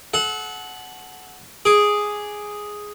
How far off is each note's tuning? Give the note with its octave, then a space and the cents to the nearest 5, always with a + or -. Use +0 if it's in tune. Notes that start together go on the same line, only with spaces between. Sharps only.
A4 -35 F#5 +0
G#4 +0 D6 +0